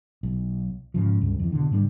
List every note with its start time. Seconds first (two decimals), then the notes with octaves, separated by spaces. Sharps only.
0.23 B1
0.94 G#2 C#3 F3
1.21 C#2 G2
1.39 F2 E3
1.52 B2 D3
1.71 G#2 C#3 G3 D4